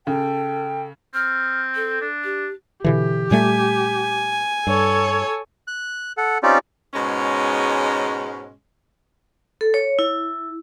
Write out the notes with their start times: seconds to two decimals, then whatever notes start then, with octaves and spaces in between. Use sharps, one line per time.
0.07 C#3 A4 G5
1.14 C4 F6
1.76 A4
2.02 D4
2.24 G4
2.84 B2 D3 E3 G4
3.31 A#2 G3 A3 G#5
4.67 G2 A4 C#5
5.68 F#6
6.17 A4 F#5
6.43 C4 C#4 D#4 F4 G4 D5
6.94 G#2 B2 G#3 C#4
9.61 A4
9.74 C#5
9.99 E4